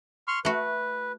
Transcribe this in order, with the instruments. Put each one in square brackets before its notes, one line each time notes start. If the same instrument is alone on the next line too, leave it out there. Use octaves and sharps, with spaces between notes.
[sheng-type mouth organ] C6 C#6 F6
[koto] A3 F#4 [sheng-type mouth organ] B4